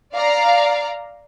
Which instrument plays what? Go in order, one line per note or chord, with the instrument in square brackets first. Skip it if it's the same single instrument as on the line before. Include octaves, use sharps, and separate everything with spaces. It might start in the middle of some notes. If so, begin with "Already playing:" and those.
[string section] D5 F5 A#5